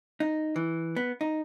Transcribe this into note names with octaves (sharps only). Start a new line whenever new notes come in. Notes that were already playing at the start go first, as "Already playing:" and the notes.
D#4
E3
B3
D#4